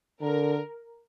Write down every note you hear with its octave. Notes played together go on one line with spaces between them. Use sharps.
D3 A#4